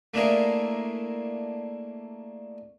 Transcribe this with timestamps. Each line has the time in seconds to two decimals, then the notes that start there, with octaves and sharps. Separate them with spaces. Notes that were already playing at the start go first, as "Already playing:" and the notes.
0.14 A3 A#3 D4 E4 G#4 A#4